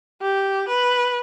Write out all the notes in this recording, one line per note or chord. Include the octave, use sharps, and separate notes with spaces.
G4
B4